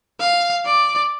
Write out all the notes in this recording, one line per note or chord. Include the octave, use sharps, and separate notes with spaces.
F5
D5